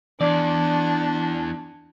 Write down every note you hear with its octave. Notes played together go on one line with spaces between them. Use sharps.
E2 D4 D5